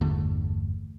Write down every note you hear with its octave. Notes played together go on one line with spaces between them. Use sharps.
G1 E2 D3 A3